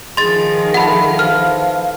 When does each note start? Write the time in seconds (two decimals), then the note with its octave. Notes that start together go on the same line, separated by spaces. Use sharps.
0.17 D#3 F3 G#4 D#5 C6 A6
0.74 E4 F4 A4 F#5 B5
1.19 B4 C5 F5 F6